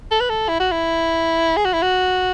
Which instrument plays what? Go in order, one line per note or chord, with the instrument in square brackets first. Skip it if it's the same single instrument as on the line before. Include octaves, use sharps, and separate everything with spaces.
[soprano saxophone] A4
B4
A4
E4
F#4
E4
G#4
F#4
E4
F#4